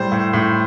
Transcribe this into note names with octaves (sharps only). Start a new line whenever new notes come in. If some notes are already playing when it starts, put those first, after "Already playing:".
Already playing: A2 G3 C5
A2
A2